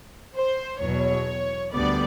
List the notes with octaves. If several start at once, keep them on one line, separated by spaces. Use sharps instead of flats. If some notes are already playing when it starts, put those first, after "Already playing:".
C5
E2 B2 F#3 C#5
D2 D3 G3 B3 D5